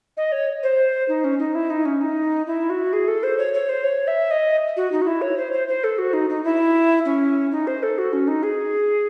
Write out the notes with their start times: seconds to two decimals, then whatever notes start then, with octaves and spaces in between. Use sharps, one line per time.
0.17 D#5
0.32 C#5
0.63 C5
1.09 D#4
1.24 C#4
1.39 D#4
1.55 E4
1.70 D#4
1.85 C#4
2.01 D#4
2.47 E4
2.70 F#4
2.93 G#4
3.08 A4
3.23 C5
3.38 C#5
3.54 C#5
3.69 C5
3.84 C#5
4.08 E5
4.31 D#5
4.77 F#4
4.92 D#4
5.02 F#4
5.07 E4
5.22 C#5
5.38 C5
5.53 C5
5.68 C5
5.84 A4
5.98 F#4
6.13 D#4
6.30 D#4
6.44 E4
7.05 C#4
7.52 D#4
7.67 C5
7.83 A4
7.98 F#4
8.13 C#4
8.28 D#4
8.43 G#4